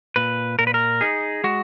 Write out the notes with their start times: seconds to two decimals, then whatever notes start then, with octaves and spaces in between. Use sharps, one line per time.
0.16 A#2 B4
0.59 A#2 A#4
0.67 B4
0.74 A#4
1.01 D#4 G#4
1.44 G#3 F#4